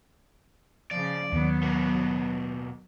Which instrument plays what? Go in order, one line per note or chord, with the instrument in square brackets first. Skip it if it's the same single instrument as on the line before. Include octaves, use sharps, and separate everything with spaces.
[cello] C#3 F3 [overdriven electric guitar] D5
[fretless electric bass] D#2 D#3 [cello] F#3 B3
[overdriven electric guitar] B2 A#3